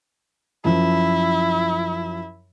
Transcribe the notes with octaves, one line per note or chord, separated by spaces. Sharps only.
F#2 F3 E4